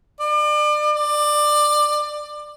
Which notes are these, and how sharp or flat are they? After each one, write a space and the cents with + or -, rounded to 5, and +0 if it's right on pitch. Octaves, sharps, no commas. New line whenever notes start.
D5 +35
D5 +20